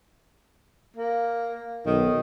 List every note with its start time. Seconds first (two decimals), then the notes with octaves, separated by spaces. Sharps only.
0.96 A#3
1.86 B1 D#3